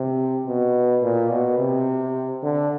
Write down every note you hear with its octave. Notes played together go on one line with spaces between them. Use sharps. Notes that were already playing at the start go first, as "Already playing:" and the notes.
Already playing: C3
B2
A#2
B2
C3
D3